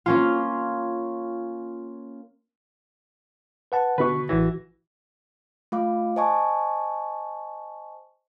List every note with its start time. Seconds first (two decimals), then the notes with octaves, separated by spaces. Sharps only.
0.06 A#3 C#4 F4
3.72 B4 F#5 A5
3.98 B2 D3 B4 C#6
4.29 A1 E3 F#4 A#6
5.72 A3 F4 F5 D6
6.16 C5 D#5 G#5 A5 C#6